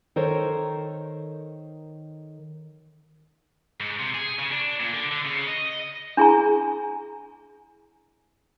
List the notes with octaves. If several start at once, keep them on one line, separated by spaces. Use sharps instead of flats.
D#3 A4 A#4 C5 C#5
G#2
C3
G#4
C#3
D4
A#2
D3
D3
C#3
D#5
D4 E4 G#4 G#5 A#5